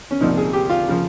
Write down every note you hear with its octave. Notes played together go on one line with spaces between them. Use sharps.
C#4
C2 A#2 F3 D#4
G#4
G4
F4
C#3 F3